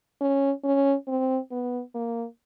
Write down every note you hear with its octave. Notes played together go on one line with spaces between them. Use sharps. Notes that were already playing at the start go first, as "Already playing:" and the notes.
C#4
C#4
C4
B3
A#3